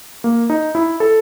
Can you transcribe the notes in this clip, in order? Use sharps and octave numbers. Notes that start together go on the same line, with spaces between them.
A#3
D#4
E4
A4